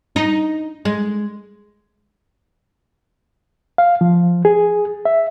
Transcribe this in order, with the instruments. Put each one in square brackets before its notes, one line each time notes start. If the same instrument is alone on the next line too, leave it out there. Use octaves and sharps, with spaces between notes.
[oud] D#4
G#3
[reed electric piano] F5
F3
G#4
E5